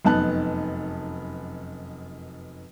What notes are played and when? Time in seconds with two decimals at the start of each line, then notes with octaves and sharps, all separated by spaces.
0.05 F1 F#2 B3 D#4 A5 F#6